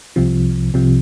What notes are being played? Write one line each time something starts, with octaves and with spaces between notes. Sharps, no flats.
C2 C3 F3
C2 C3 F3